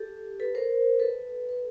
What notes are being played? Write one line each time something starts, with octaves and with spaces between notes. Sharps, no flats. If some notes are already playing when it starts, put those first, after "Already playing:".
Already playing: G4 A4
A4 B4
A#4 C5
A4 B4
B4